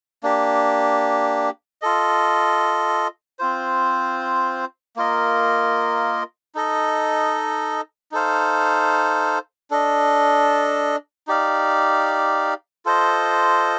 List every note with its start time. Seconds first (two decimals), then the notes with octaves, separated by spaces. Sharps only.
0.23 A#3 D4 G4
1.82 F4 A4 D#5
3.39 C4 F4 C5
4.96 A#3 F4 A#4 D#5
6.55 D#4 A4 D#5
8.12 D#4 A4 C5 F5
9.71 D4 A4 D#5
11.27 D#4 G4 D5 F5
12.86 F4 A4 C5 D#5